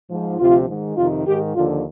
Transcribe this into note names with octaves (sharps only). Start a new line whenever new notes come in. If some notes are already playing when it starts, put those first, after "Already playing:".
G#2 F3
D2 C3 F3 F4
G#2 D#3
F2 C3 D#3 F4
G#2 D#3 G4
D#2 D3 F3 F4